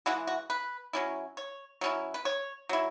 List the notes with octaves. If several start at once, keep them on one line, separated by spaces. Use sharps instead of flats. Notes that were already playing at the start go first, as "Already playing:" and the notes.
E3 G#3 E4 F#4
F#4
B4
F#3 C#4 E4
C#5
F#3 C#4 E4
B4
C#5
F#3 E4